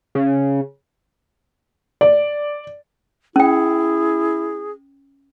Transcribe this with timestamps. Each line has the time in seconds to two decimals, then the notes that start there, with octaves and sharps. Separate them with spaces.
0.15 C#3
2.01 D5
3.36 C#4 E4 G#4 G5